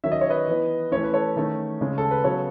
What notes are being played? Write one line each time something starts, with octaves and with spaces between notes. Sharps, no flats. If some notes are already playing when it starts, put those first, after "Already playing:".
D#3 F#3 C#4 E5
D#5
C#5
B4 D#5
E3 B3
E3 A3 C#4 C#5
B4
A4 C#5
D#3 A3 C#4
C#3 G#3 C#4
A4
B4
C#3 F#3 B3 A4 C#5